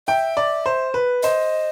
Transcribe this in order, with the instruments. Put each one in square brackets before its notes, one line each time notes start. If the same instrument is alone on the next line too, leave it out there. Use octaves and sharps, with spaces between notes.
[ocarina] E5 [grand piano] G5
[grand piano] D5
C5
B4
[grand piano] C5 [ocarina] D#5